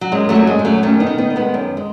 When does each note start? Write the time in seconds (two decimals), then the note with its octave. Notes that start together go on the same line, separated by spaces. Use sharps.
0.01 F#3
0.12 F#2 G#3
0.29 F#3 A3
0.35 F#2
0.47 G#3
0.59 F#2
0.65 F#3 A3
0.83 D#3 A3 C#4
1.00 B3 D#4
1.07 D#3
1.18 B3 D#4
1.30 D#3
1.36 G#3 B3
1.54 F#2
1.77 G#3